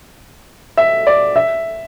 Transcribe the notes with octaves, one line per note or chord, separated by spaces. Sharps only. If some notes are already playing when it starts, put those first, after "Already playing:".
E5
D5
E5